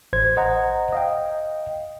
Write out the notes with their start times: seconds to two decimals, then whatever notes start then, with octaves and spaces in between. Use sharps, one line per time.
0.13 A1 C5 G#6
0.37 C5 D#5 F#5 A#5
0.93 D#5 F5 G5